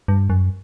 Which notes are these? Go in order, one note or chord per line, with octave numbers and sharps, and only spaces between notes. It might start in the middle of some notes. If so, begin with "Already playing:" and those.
G2
F#2